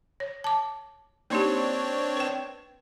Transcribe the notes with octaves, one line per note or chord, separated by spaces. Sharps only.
C#5
A5 D6
A#3 C4 D4 D#4 G4 C#5
B4 G5